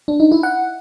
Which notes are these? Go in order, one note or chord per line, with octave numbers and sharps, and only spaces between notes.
D4
D#4
E4
F#5